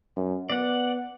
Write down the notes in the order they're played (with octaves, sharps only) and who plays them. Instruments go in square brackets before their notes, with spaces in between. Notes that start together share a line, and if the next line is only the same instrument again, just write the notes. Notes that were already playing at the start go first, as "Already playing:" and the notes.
[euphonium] F#2
[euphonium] B3 [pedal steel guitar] D5 F#5